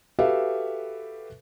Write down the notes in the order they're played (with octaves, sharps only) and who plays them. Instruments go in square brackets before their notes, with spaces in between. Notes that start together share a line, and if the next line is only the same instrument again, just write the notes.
[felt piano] F#4 G4 A4 B4 E5 F5